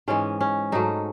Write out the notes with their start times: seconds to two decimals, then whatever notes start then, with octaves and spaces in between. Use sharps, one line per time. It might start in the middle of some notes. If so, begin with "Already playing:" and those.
0.08 G#2 E3 G#3 C#4
0.41 C#4
0.72 G#2 F#3 A3 D#4